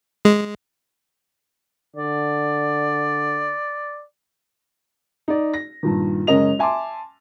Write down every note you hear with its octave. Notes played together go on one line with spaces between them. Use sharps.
G#3
D3 D5
D#4 D5
A#6
G2 A#2 D#3
F#1 G#3 C#4 A#4 D#5 F7
E5 G#5 A5 C6 D6